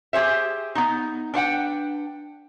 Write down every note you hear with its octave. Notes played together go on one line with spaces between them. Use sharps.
G4 G#4 C5 E5
B3 D#4
D4 B4 F#5 G5